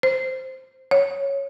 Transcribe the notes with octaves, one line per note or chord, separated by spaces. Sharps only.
C5
C#5